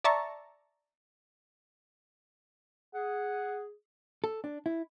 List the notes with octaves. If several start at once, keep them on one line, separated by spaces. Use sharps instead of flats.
D5 E5 A5 A#5 C#6
G#4 F#5
A4
D4
E4